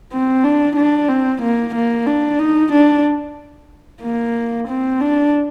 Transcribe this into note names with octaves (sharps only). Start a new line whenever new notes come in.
C4
D4
D4
C4
A#3
A#3
D4
D#4
D4
A#3
C4
D4